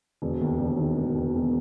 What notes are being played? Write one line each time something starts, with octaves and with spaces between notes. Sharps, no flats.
E1
D#2
E1
D#3
E1
E1
E1